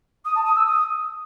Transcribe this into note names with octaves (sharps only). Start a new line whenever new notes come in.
D#6
A5
D#6
E6
D#6